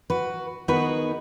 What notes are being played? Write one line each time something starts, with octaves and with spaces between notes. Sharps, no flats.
F#4 B4
D#3 B3 D#4 F#4 G#4 B4